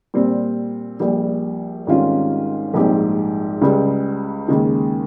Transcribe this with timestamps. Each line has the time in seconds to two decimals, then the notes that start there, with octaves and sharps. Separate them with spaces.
0.14 A#2 G3 C4
1.00 A#1 A#2 G3
1.87 G#1 G#2 G3 C#4 F4
2.74 A#1 G#2 G3 C4 G4
3.61 C#2 C#3 G3
4.48 D#2 C#3 G#3 D#4